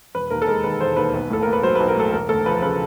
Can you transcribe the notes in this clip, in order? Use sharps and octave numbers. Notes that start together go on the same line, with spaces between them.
E1 B4
D#2 A#4
A4
G#3 A#4
D#3 B4
E1 C5
D#2 B4
B1
A2 A4
A#3 A#4
B4
F#3 C5
B1 B4
A#4
A2 A4
E1 A#4
D2 A4
F3 B4
C#3 B4